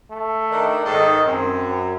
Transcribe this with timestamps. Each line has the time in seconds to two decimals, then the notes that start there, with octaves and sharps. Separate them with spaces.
0.11 A3
0.51 D#3 D4
0.85 G#2 D#3 A4 D#5
1.26 F#2 C4